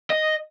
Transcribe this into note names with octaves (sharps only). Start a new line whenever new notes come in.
D#5